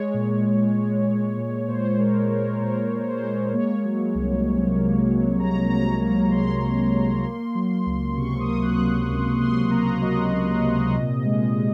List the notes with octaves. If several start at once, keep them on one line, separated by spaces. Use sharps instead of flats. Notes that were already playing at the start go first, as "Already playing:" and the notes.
Already playing: G#3 C#5
A#2
A#2
G#3
G#3
A#2
A#2 C5
G#3 A#4
G#3 A#4
A#2 A#4
A#2
C5
G#3
A#3 C#5
F#3
C2
C3
A#3
F#3
C2 A#5
C3 A#5
A#3 A#5
F#3 C6
C2
C3
A#3
F#3
C#2
C3 C#6
D#6
A#3
F#6
F#3
C#2
C3 C6
A#3 A#5
F#3 D#5
C#2
C3
A#2
G#3
A#2